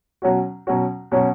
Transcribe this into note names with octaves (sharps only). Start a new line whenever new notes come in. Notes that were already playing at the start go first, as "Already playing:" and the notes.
B2 F#3 C#4 F#4
B2 F#3 C#4 F#4
B2 F#3 C#4 F#4